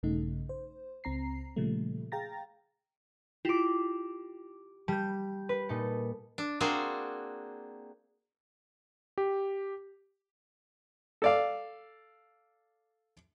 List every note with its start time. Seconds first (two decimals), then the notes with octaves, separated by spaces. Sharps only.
0.03 A#1 G2 C#3 A3 D#4
0.49 C5
1.04 C#2 C4 A#5 C7
1.56 A#2 C#3 F3 G3 A3
2.12 G#4 F5 G5 A#5 A6 A#6
3.45 E4 F4 G4 D6
4.88 G3 A5 G6
5.49 B4
5.69 A#2 D#4 A4
6.38 D4
6.60 A#3 C4 D4 F#4 G#4 C5
9.18 G4
11.22 A4 D5 F5